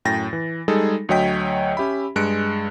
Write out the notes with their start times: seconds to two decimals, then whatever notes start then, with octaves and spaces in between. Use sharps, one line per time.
0.05 F#2 A2 G5 A6 A#6
0.33 E3
0.68 G3 G#3 D#4 G#4 A4
1.09 D2 F#3 C#5 D#5 G5 B6
1.77 C#4 G4 E5 B5
2.16 G2 G#3 F#6 C#7 D7